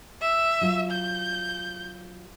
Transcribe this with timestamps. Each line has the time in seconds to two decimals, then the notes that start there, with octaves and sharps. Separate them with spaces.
0.22 E5
0.61 F#3 F4
0.91 G6